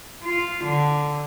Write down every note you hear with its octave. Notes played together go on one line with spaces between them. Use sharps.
F4
D3